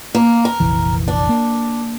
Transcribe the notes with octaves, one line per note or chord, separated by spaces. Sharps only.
A#3
A#4
F1 A#1 E3
D4
A#3